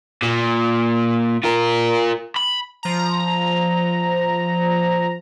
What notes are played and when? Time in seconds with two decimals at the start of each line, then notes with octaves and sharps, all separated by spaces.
0.22 A#2
1.44 F4 A#4
2.37 B5
2.83 F3 A#5